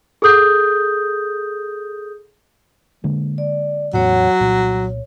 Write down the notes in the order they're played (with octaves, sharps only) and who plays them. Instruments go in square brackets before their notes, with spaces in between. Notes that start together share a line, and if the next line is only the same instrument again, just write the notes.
[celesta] G#4 A4 D#6 G6
[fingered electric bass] D3 G#3 A#3
[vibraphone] D5
[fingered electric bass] E2 A2 [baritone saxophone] F#3 [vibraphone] C#5 F#5
[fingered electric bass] C2 A#2 [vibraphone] C#5